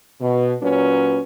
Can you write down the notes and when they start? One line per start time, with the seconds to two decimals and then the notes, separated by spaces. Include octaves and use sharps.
0.20 B2
0.62 A#2 F#3 C#4 B4